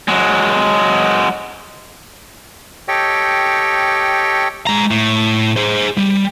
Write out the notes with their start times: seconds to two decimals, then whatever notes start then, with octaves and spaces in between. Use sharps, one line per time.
0.08 F#3 G#3
2.88 G4 A4 C#5 D#5 G5
4.67 G#3 A#5
4.91 A2
5.57 G#4 C5
5.97 G3